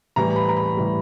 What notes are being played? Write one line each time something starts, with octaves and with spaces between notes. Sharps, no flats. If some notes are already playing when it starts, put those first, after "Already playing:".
A2 E3 G3 A#5
B5
A#5
B5
A2 E3 G3